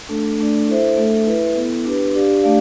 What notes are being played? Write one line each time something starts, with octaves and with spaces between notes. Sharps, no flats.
A3 D4 A4
A3 D4 A4 D5
E4 A4 C5 E5
A3 D4 A4 E5
E4 B4 E5
B3 E4 A4
D4 G4 B4
D4 G4 D5 F5
A3 D4 G4 D5 F5